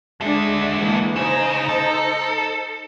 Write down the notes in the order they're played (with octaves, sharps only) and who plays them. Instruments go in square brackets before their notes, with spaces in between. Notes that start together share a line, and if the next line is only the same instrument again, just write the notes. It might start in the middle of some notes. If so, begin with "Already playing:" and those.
[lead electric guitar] D3 E5 [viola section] G#3 D4
[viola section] E3 G#3 A#3
[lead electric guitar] C#3 [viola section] D#4 C5 A#5
[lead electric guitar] A4